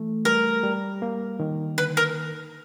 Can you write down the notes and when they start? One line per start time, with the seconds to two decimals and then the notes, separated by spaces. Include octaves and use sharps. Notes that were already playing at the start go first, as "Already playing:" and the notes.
Already playing: E3 A3
0.25 G3 A#4
0.63 G3
1.02 A#3
1.40 D#3
1.78 D3 B4
1.97 A#4